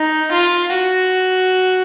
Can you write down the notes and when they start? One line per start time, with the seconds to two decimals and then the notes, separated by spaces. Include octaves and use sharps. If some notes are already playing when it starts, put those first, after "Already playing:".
Already playing: D#4
0.32 F4
0.74 F#4